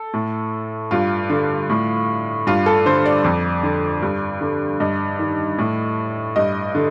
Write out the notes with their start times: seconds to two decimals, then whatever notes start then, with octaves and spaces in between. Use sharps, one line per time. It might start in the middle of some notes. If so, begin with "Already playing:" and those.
Already playing: A4
0.14 A2
0.91 G2 F4
1.30 D3
1.70 A2
2.47 G2 F4
2.66 A4
2.86 D3 C5
3.06 D5
3.24 F2
3.63 D3
4.02 G2
4.41 D3
4.80 G2 D#5
5.19 D#3
5.58 A2
6.36 G2 D#5
6.75 D3